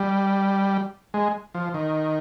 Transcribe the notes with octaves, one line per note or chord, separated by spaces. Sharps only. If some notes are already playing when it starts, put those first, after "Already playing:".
Already playing: G3
G#3
F3
D#3